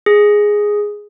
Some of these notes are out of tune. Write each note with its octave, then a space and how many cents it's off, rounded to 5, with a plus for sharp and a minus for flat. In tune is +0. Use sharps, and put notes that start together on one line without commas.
G#4 +0